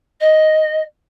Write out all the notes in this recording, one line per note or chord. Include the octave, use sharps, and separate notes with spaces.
D#5